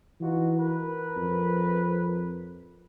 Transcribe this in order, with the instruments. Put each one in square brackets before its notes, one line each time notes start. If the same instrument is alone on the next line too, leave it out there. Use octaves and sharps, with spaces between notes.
[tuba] E3 [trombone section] D#4 F4 F#4
[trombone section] A#4 B4
[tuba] F2